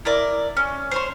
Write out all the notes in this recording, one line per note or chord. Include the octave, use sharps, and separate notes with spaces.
E4 A#4 D5
C#4
C5 C#5 C6